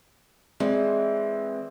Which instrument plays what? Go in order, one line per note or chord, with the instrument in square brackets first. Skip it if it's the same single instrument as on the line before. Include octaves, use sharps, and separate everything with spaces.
[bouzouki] E3 [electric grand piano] G#3 C4 D5